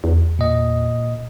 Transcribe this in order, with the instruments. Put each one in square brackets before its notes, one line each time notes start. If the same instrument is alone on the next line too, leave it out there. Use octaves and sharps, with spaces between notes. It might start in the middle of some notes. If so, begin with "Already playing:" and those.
[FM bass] E2
[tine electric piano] A#2 D#5